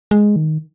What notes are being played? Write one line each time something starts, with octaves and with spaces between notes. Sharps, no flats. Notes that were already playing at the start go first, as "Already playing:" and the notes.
G#3
D#3